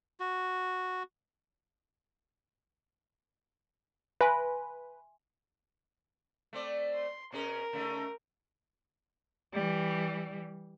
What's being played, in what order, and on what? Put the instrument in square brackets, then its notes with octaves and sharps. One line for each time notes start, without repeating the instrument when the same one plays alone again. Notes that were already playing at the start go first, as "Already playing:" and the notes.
[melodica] F#4
[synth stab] B4 [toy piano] E5 G#5 C6
[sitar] A3 C4 D5
[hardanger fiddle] C6
[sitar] B2 C#4 G#4 [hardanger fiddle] A#4
[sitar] C#3 A3 D#4
[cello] E3 G3